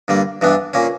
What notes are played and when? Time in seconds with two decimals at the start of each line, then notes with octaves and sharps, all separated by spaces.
0.08 G2 D3 G3 A#3
0.41 G2 E3 B3 D4
0.73 A#2 A#3 C#4